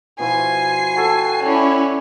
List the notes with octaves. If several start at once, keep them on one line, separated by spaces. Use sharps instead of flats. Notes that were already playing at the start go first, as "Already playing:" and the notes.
B2 F3 E4 G#5 C7
F#4 A4 G5
C#4 E4 A4 C#5 D5